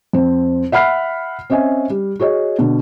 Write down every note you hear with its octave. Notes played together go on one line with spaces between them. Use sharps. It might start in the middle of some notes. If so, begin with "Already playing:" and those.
F2 C4
E5 F#5 B5 F6 C7
C4 C#4 D#5 E5 G#5
G3
F#4 G#4 C#5 D#5
B2 D3